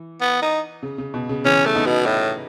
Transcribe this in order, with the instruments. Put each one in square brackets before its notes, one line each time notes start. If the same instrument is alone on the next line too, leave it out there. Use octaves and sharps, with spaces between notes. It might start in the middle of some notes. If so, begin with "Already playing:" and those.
Already playing: [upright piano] E3
[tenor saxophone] B3
D#4
[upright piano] C#3
C#3
B2
C#3
[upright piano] C#3 E3 [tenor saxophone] C#4
[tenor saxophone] A3
[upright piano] B3 D#4
[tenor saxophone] B2
A2